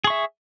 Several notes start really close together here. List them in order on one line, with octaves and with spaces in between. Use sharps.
G#4 C#6 E5